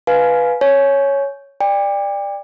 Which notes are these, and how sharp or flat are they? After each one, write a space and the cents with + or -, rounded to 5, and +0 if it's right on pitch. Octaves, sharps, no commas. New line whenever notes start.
B4 +0 F5 +0 G#5 +20
C#5 +0 G#5 +25
D5 +10 G5 +35